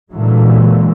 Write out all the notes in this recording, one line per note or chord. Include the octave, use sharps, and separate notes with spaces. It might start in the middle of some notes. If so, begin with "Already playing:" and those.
A#2 D3 E3 F#3 G#3